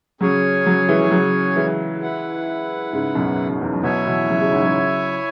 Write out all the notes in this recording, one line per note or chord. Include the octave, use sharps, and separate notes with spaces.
C#3 F#3 C#4 G#4 C#5 G#5
C#3 F#3
E3 G#3
E3
C#3 F#3
E3 G#3
E4 B4 F#5
G#2 C#3
F#2 B2
F#2
E2
F#2
F#2 B2 E4 C#5 E5 G#5
B2 E3
C#3 F#3
C#3 F#3
G#2 C#3
C#3 F#3